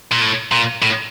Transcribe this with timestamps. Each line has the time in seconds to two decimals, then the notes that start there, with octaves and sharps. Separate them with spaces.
0.12 A#2
0.21 A2
0.52 A#2
0.82 A2